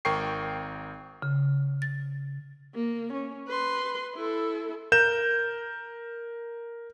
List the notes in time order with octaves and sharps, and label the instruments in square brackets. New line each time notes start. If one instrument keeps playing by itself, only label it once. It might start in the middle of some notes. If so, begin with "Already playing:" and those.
[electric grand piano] G#1 A#4 G5 C#6 C7
[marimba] C#3
A6
[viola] A#3
C#4
B4 C6
E4 A4
[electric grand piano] A#4 G6 E7